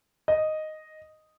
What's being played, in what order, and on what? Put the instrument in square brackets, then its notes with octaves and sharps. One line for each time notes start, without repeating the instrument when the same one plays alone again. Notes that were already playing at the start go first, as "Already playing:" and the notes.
[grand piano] D#5